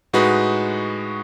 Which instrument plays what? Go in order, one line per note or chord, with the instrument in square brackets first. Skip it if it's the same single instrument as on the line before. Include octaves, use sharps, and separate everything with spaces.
[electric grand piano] A2 G#3 D#4 F#4 B4